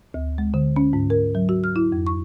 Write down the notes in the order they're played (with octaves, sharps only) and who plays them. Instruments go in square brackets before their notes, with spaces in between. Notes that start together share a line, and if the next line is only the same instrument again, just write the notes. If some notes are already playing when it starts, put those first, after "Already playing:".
[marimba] D2
G#3
D3
C#4
G#2
A#4
F#3
F#4
F6
E4
F2
C#6